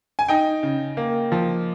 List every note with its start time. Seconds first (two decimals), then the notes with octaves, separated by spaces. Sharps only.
0.19 G#5
0.28 D#4 G5
0.63 C#3
0.97 A#3
1.32 F3